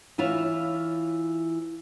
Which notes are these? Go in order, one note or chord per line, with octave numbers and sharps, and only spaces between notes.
E3 E4 F4 C#5 F5